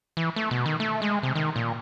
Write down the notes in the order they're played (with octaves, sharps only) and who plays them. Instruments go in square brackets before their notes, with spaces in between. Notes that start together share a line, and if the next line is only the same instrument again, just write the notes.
[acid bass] E3
A3
B2
D#3
A3
G#3
C3
D#3
A#2